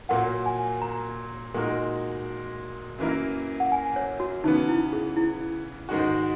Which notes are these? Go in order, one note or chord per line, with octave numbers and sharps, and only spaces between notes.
A#2 F#3 A#3 F#5
G#5
A#5
A#2 G#3 D#4 F#4 A#4
F#2 E3 A#3 E4 A#4
F#5
G#5
C#5
F#4
C#3 E3 B3 D#4
E4
G#4
E4
G#2 D#3 G#3 D#4 F#4